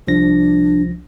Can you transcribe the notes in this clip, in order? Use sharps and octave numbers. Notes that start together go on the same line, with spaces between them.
C2 F3 D4 A#6